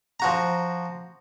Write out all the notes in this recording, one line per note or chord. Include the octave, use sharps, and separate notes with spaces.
F3 F#4 A#5